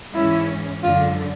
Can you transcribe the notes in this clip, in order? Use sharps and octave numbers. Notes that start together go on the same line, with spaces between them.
G#2 E3 G#3 C#4 E4
F#2 D3 F3 G#3 F4